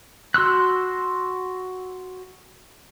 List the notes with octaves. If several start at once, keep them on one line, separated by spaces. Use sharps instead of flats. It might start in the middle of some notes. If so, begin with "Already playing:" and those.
F#4 C6 E6 F#6